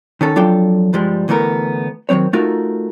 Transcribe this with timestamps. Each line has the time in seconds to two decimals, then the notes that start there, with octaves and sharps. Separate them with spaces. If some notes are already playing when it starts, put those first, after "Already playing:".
0.21 D#3 C#4 A4
0.36 F2 F#3 D4 F4 A4 G5
0.93 G2 F3 G3 G#3
1.28 D2 E3 A3 B3 A#4
2.09 D#3 E3 F#3 C4 C#5
2.33 A3 D#4 F4 F#4 A#4